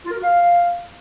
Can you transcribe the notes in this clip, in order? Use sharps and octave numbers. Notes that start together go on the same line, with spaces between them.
F4
A#4
F#4
F5